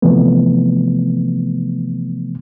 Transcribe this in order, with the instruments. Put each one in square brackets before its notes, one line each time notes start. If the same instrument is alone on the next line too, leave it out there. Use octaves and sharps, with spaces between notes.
[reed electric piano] C3 E3 F3 A3 B3